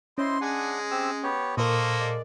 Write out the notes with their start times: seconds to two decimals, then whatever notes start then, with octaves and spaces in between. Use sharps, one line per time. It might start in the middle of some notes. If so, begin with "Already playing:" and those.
0.18 C#4 E4 C5 D#5 C6
0.41 G#3 D4 F#5 G#5
0.91 C4 G4 E6
1.23 B3 G4 C#5
1.57 A#2 A#3 A4 A#4 C5 D#5 C#6 D#6
1.99 G#3 D5